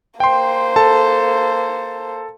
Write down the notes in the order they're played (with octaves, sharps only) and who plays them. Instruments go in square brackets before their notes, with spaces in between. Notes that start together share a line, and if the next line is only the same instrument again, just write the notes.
[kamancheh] A#3 C5 [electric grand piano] G5 C6
[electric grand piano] A4 A5